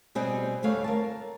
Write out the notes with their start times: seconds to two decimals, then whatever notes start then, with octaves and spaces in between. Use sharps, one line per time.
0.15 B2 G3 C4 G#4 D#5
0.63 D2 G3 A3 C#5 F5
0.84 A#4 A5